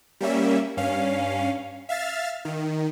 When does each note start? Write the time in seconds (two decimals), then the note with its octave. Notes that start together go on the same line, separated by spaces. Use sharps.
0.21 G3 A#3 C#4 E5
0.77 G2 C#4 F5
1.89 E5 F5 F6 A6
2.45 D#3